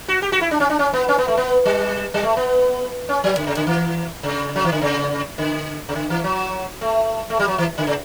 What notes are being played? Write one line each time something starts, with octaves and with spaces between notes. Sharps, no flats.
F#4
G4
F#4
E4
D4
C#4
D4
C#4
B3
C#4
B3
A3
B3
G3
G3
A3
B3
C#4
F#3
D3
C#3
D3
E3
C#3
F#3
E3
D3
C#3
D3
C#3
D3
E3
F#3
A3
A3
G3
F#3
E3
D3
C#3